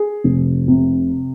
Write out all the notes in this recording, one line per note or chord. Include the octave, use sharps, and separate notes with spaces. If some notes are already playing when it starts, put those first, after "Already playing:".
Already playing: G#4
F1
C3